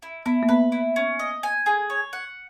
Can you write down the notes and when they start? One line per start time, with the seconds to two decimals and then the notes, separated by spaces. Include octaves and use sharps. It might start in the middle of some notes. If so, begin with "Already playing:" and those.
0.03 E4
0.26 B3 E4
0.43 A#3
0.49 B3 B4
0.72 E4
0.96 C#4
1.19 D#5
1.43 G#5
1.66 G#4
1.90 C#5
2.13 F#5